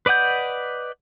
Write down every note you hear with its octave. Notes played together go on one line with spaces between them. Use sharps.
B4 D5 D#5 F#5 G6